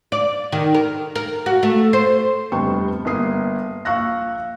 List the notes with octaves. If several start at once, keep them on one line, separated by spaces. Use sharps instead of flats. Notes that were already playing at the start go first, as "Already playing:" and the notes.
D5
D#3
A#4
A#4
F#4
A3
C5
F1 G2 C3 B3 G5 C#6
G1 A#3 A#4 D#6 C7
A#1 F5 C#6 E6 F#6 A#6